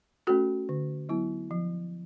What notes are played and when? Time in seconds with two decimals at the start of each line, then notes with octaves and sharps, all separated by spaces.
0.27 A3 C#4 F#4 A4
0.69 D3
1.09 F#3 B3 E4
1.51 F3